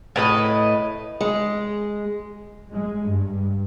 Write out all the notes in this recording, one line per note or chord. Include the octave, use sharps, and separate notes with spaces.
A2 B4 D#5
G#3
G#3
G2